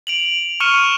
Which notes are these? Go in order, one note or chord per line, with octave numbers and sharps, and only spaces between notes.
D7 F7 F#7
C#6 F6 C#7 D#7 E7 G7